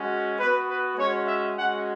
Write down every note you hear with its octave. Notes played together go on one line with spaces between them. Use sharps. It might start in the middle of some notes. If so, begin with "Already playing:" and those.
Already playing: G#3 C#4 F#4
B3 F#4 B4
B4
G#3 C#4 F#4 C#5
E5
G#3 C#4 F#4 F#5